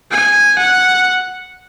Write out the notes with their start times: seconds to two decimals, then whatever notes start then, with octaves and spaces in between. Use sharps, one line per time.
0.11 G#5
0.59 F#5